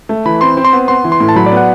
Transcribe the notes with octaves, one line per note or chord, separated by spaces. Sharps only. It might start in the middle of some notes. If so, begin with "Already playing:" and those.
A3
E3 B5
C4 C6
C4
C6
B3
B3 C6
E3
C6
A2
A5
F#3 B5
D5
B3
F#5